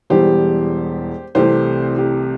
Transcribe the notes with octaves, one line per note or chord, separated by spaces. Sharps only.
E1 E2 E3 G3 G4 C5
C2 C3 E3 A3 G4 C5
G4